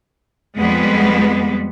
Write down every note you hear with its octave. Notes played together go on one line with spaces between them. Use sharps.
F2 G3 G#3 B3